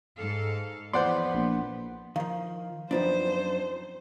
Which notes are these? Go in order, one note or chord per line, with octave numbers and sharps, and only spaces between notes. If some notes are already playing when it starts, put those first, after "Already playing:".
G#2 A4 F5
E2 F3 B3 B4 C5 D5 F#5 C6
A#1
D#3 F3 F5
F#2 F3 B3 C4 D4 D#4 C5